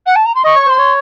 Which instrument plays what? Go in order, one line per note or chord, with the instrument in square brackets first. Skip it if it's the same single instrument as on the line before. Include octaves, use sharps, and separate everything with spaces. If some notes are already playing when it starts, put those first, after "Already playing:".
[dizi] F#5
A5
A#5
C6
[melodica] D#5 [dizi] C#6
[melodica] C#5
[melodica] C5 [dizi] C6
[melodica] C#5